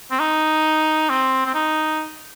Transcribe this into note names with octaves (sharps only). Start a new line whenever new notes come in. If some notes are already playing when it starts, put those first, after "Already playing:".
C4
D#4
C4
C4
D#4